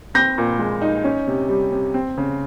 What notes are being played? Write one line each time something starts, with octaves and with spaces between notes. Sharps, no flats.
C4 G6 A#6
A#2
G#3
D#4
C#4
C3
G3
C3
C4
C#3